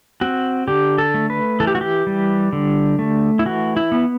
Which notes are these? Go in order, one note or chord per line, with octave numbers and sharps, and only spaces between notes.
C4 F#4
D3 G4
A4
A3
B4
E3 A4
G4
F#4
G4
G3
D3
A3
E4
E3 F#4
E4
B3